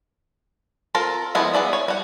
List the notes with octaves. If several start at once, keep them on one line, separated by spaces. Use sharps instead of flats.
C4 F4 A4 A#4
D#3 F3 G#3 B3 E4
B3 G#4 D5 E5
C#5
G3 F#5